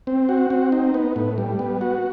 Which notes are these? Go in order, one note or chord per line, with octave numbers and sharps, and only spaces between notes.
C4
F#4
C4
D#4
B3
A2
G3
B3
F#4